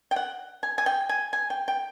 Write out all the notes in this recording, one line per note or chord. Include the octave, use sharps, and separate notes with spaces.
G5
F#5
G#5
G#5
G5
G#5
G#5
G5
G5